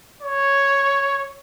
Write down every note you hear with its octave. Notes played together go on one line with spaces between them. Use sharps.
C#5